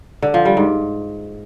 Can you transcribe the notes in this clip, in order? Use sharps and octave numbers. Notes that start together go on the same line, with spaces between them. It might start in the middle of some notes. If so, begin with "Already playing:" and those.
D3
F3
G3
G#2